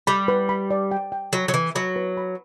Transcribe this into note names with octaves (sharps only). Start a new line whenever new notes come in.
G3 B5
B4
B5
D5
G5
G5
F#3 B5
F#3
E3 B4
F#3 B5
B4
B5